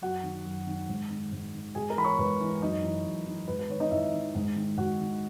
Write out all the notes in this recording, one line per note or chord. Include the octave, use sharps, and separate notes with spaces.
F#2 F#4 F#5
D#3
F#2
D#3
G#2
D#3
G#2
D#3
G#2 G#4 G#5
A#4 A#5
E3 B5
C#5 C#6
G#2 B4 B5
E3
F#2 D#4 D#5
E3
F#2
E3
G#2 B4
B4
D#3 C#5
D#4 D#5
G#2 E4 E5
D#3
G#2
D#3
G#2 F#4 F#5
D#3